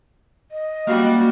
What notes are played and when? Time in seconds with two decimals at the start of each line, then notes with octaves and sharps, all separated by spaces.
0.51 D#5
0.87 C#2 G3 A#3 F#4 F5